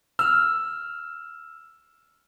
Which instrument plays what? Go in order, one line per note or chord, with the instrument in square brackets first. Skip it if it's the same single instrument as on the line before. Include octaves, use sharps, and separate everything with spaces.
[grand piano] E6 F6